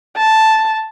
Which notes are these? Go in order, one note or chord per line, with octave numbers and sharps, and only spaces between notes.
A5